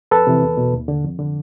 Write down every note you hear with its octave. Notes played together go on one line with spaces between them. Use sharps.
F2 A4 B4
C3 E3
E2
B2
D#2
D3
F2
D3